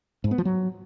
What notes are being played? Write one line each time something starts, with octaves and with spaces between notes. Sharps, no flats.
G#2
B3
F3
F#3